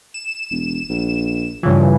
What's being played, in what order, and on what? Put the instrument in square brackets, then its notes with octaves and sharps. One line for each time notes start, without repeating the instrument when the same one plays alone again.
[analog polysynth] E7
[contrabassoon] E1
A#1
[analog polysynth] G2 C#3 E3 [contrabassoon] F3